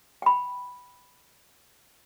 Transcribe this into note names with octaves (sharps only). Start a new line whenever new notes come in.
G5 B5